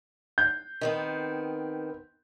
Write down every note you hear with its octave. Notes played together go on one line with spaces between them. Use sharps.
G6
D#3 B3 C4